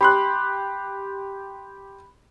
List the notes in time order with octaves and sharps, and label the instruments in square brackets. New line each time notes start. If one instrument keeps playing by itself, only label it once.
[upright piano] G4 C6 F#6 [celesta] B5